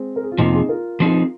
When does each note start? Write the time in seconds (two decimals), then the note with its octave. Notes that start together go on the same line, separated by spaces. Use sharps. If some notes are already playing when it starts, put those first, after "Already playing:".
Already playing: G#3 C4
0.16 A#4
0.23 G#4
0.32 F4
0.38 F2 C3 F3 A#3 D#4
0.53 D#4 G#4
0.69 F4 A#4
1.00 F3 C4 D#4 G#4